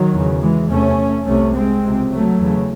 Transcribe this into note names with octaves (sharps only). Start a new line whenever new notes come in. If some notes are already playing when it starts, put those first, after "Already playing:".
Already playing: D#3 F#3
E2 C#3
E3 G#3
E2 C3 A3 C#4
C2 C3 A3 C#4
G#3 C4
C#2 C3
F#3 A3
E2 C#3